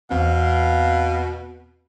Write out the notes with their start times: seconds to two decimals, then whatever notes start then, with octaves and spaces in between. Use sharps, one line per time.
0.11 E2 B2 C4 F5